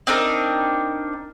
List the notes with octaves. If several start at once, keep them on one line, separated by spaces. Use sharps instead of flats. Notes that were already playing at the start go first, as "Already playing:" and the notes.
C4 D4 D#4 A#4